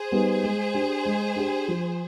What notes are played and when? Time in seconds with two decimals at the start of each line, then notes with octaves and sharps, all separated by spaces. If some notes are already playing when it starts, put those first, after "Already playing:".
Already playing: G#4 C5
0.12 G3 B3 D#4
0.43 G#3
0.74 D4 G4
1.05 G#3
1.36 D4 G4
1.68 F3